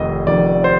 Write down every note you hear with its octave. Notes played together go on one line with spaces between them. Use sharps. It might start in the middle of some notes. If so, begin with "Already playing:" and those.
Already playing: F1 F2 D#3 D#5
F1 F2 D#3 D5
C5